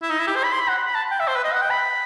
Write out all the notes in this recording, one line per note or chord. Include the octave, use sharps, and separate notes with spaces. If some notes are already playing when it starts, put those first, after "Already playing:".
E4
D#4
E4
G4
C5
B5
C6
B5
F#5
B5
A5
G5
E5
C5
B4
D#5
F#5
G5
B5